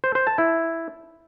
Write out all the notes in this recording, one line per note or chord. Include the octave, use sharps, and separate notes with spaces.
C5
C5
A5
E4